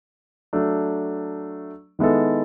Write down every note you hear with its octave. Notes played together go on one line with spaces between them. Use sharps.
F#3 A3 D4
D#3 G#3 B3 E4 A4